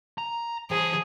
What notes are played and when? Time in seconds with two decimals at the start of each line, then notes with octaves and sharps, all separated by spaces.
0.18 A#5
0.71 E3 G#4 C5